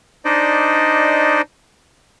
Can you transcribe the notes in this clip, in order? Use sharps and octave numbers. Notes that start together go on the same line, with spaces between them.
D4 D#4 C5 D5 D#5